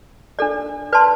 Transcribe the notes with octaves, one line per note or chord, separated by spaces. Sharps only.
D4 A4 D5
B4 D5 A5 C6